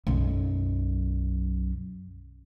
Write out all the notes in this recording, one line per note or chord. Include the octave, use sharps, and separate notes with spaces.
B1 F#2